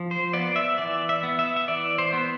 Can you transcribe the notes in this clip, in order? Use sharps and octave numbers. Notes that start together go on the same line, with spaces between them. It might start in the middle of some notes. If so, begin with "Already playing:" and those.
Already playing: F3
C5
B3 D5
E5
E3 D5
E5
B3
E5
E5
E3 D5
C5
B3